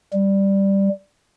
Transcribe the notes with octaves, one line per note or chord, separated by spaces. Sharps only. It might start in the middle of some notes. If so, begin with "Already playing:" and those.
G3